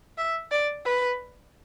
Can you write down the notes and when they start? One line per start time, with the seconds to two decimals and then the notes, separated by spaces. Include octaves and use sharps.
0.18 E5
0.51 D5
0.85 B4